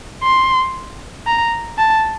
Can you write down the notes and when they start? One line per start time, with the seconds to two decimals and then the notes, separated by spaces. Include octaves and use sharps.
0.23 C6
1.26 A#5
1.78 A5